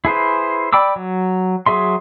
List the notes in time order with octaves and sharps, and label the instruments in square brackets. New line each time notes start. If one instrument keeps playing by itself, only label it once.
[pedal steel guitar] E4 G#4 B4 C5
D5 G5 B5 D6 E6
F#3
F#3 G#4 E5 C6